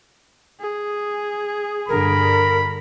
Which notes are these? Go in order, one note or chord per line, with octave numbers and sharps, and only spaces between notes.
G#4
G2 D3 A#4 B5